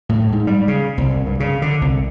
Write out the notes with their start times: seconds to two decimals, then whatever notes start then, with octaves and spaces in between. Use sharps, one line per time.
0.09 A2
0.32 G#2
0.47 G3
0.68 C#3
0.98 C2
1.26 G2
1.40 C#3
1.62 D3
1.81 C2